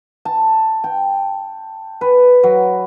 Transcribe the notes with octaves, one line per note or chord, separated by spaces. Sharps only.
A5
G5
B4
F#3